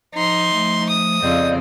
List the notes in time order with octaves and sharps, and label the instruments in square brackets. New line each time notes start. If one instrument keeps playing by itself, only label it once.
[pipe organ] F3 [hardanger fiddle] D#4 C6
[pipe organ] F3 A3
[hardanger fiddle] D#6
[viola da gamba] F2 C#3 C4 [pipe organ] D5 D#5 G6